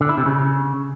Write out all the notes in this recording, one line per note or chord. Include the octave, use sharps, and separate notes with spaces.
D3
E4
C3
C#3